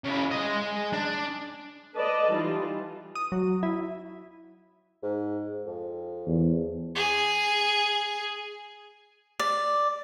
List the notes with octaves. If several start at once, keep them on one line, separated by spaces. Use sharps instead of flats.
C#3 E4
G#3 D#5
D4
A4 B4 D5 D#5 A5
E3 G3 D#4 F4
D#6
F#3
E4
G#2
F2
E2
G#4
D5